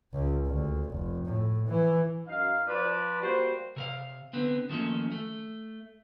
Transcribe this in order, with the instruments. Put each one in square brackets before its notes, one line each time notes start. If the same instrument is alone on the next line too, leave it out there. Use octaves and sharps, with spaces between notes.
[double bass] C#2
D2
F1
A2
E3
[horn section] F#2 D#4 F5
F3 B4 D5
G3 A#3 F#4 C5
[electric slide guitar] C3 A#4 F5
D3 B3 C4
D#3 F3 A3 A#3 C#4
A3